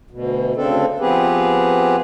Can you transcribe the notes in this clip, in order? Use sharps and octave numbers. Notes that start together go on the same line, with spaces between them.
D2 B2
D2 C#3 C4 D4 A4
F3 B3 C4 G4 G#4 B4